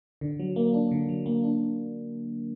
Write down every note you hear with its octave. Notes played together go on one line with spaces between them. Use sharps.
D3
F#3
A#3
D4
D3
F#3
A#3
D4